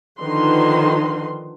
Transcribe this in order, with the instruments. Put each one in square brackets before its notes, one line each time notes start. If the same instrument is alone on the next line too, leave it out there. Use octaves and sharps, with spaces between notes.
[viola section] D3 D#3 F3 D#4 B4 C6